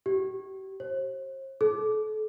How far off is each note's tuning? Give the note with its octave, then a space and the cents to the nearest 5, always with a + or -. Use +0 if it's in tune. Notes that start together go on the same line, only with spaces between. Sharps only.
G4 -35
C5 +40
A4 -35